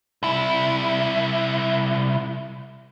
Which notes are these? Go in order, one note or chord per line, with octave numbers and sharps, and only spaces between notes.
C2 E4